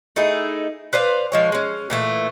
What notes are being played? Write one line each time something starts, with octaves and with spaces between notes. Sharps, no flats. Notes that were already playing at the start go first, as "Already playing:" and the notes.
A3 D#4 E4 G#4
B4 C5 D5 F5
F3 G#3 C#5
G#3 C#4
A#2 E3 A3